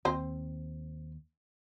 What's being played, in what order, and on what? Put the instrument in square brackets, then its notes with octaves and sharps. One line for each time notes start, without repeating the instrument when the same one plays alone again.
[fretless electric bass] D#2 [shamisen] C4 C5